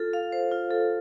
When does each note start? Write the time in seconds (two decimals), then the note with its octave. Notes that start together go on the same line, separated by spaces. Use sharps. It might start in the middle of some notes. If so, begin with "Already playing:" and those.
Already playing: F4 A4
0.13 F5
0.32 C5
0.52 F4
0.71 A4